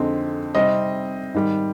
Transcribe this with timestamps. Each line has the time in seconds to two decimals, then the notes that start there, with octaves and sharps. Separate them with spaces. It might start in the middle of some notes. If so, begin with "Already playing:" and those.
Already playing: F2 D3 G#3 C4 D#4
0.55 C3 G3 C4 D#4 D#5
1.34 G#2 D#3 G3